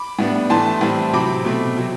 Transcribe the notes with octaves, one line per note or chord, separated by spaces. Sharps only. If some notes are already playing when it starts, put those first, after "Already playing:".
Already playing: B5 D6
A2 G3 B3 D4
A2 E3 A3 A5 C6
A2 E3 G3 C4
C3 F#3 C4 B5 D6
B2 A3 C4
C3 F#3 C4